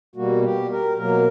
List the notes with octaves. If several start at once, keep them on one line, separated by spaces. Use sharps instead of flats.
B2 G3 A#3 F#4
G4
A#4
B2 F#3 A#3 A#4